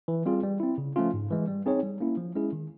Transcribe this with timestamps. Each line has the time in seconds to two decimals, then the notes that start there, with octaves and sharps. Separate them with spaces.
0.08 E3
0.26 G3 C4 F4 G#4
0.43 G3
0.60 C4 E4
0.78 C#3
0.96 F3 A3 C#4 F4
1.13 G#2
1.31 E3 G#3
1.47 G3
1.66 C4 D#4 G#4 C#5
1.83 G3
2.01 A#3 C#4 E4
2.17 F3
2.35 G#3 C#4 E4 G#4
2.52 D#3